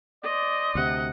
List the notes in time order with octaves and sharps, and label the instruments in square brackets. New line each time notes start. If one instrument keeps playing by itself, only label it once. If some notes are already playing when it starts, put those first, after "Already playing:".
[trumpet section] C5 D5 [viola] D#5
[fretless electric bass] D2 C3 [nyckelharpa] F#5